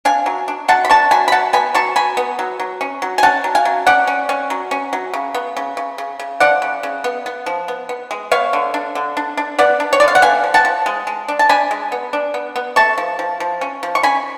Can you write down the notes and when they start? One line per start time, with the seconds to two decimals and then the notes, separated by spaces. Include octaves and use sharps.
0.05 D4 F5 G#5
0.26 F#3
0.48 D4
0.68 F#3 F#5 A5
0.85 B5
0.89 D4 A5 C#6
1.11 F#3 G#5 B5
1.28 B5
1.32 F#3 F#5 A5
1.53 B3 G#5 B5
1.74 F#3 A5 C#6
1.96 F#3 G#5 B5
2.17 B3
2.39 F#3
2.60 F#3
2.81 C#4
3.02 F#3
3.18 G#5
3.23 C#4 F#5 A5
3.44 F#3
3.55 F5 G#5
3.65 F#3
3.87 C#4 D5 F#5
4.07 C#4
4.29 C#4
4.50 F#3
4.71 C#4
4.93 F#3
5.13 C#3
5.34 B3
5.57 C#3
5.77 C#3
5.98 C#3
6.19 C#3
6.40 F3 D5 F#5
6.62 C#3
6.83 C#3
7.04 B3
7.26 B3
7.46 F3
7.68 B3
7.89 B3
8.11 G#3
8.31 B3 C#5 F5
8.53 D3
8.74 D4
8.95 D3
9.17 D4
9.37 D4
9.59 B3 D5 F#5
9.80 D4
9.93 C#5
10.00 D3 D5
10.08 F5
10.15 F#5
10.22 B3 F5 G#5
10.44 F3
10.54 F#5 A5
10.65 F3
10.86 G#3
11.07 G#3
11.28 D4
11.39 A5
11.49 D4 G#5 B5
11.71 G#3
11.92 B3
12.13 D4
12.34 B3
12.56 B3
12.76 A3 A5 C#6
12.98 F3
13.19 F3
13.40 F3
13.61 C#4
13.83 F3
13.95 C#6
14.03 C#4 G#5 B5